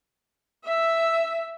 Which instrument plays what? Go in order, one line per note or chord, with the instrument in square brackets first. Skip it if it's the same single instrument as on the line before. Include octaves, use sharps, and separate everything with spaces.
[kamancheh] E5 E6